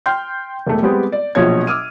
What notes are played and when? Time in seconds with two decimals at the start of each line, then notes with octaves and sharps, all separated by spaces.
0.06 G5 C6 F6 G6
0.67 E1 A3
0.82 G3 G#3 B3 C4 G4
1.12 D5
1.35 A#1 B2 F3 F#3 C#5 G#6
1.67 D6 E6 F6 D#7